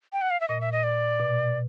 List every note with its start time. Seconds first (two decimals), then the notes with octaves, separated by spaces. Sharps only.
0.13 G5
0.22 F#5
0.31 F5
0.40 E5
0.48 A#2 D#5
0.61 E5
0.72 D#5
0.84 D5
1.20 B2